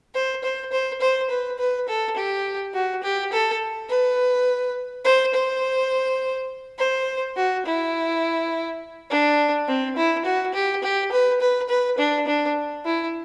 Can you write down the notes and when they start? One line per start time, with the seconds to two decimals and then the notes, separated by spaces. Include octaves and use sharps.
0.14 C5
0.44 C5
0.72 C5
1.01 C5
1.30 B4
1.58 B4
1.88 A4
2.16 G4
2.74 F#4
3.03 G4
3.32 A4
3.90 B4
5.05 C5
5.34 C5
6.79 C5
7.36 F#4
7.66 E4
9.10 D4
9.68 C4
9.97 E4
10.25 F#4
10.54 G4
10.83 G4
11.12 B4
11.41 B4
11.69 B4
11.98 D4
12.27 D4
12.85 E4